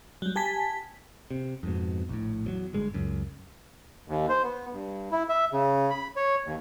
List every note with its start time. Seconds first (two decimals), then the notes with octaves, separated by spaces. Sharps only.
0.22 F#3 G3
0.36 G4 G#5 A5 B6
1.31 C3
1.63 F2 G#2 B2
2.09 A#1 A2
2.45 E2 F3 F#3
2.73 G1 G2 G#3
2.94 C#2 F#2
4.08 D#2
4.29 C5
4.43 B3
4.72 G2
5.12 E4
5.29 E5
5.53 C#3
5.90 B5
6.16 C#5
6.46 D#2